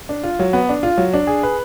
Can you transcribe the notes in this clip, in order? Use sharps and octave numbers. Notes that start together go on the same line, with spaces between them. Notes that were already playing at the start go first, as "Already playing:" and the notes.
D4
F4
F#3
B3
D4
F4
F#3
D4
G#4
B4